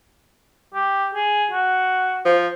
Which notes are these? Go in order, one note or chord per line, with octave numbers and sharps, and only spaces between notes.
G4
G#4
F#4
F3